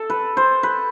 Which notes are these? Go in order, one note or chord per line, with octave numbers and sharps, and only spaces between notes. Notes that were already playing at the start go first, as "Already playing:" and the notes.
Already playing: A4
B4
C5
B4